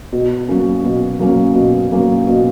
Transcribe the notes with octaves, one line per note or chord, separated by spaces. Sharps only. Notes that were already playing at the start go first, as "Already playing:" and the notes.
B2
F#3 A#3 C#4
B2
F#3 A#3 C#4
B2
F#3 A#3 C#4
B2